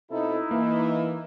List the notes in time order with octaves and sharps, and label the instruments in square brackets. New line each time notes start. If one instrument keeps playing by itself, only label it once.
[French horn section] B2 C4 A4 [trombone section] D#4 E4
[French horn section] E3 [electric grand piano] A#3